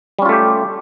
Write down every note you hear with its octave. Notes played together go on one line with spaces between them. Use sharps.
G3 A3 C#4 F4 G4